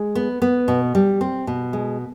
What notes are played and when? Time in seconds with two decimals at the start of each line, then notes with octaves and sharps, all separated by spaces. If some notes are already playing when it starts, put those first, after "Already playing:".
Already playing: G#3
0.15 B3
0.42 B3
0.68 B2
0.95 G3
1.21 C4
1.47 B2
1.73 G#3